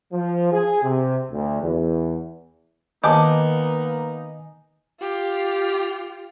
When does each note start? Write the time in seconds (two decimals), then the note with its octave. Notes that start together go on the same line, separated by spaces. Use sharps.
0.13 F3
0.52 G#4
0.83 C3
1.32 D2
1.63 E2
3.04 D#3 A#3 B3 D#4 D#5 G#5 A5 D6
5.00 F4 G4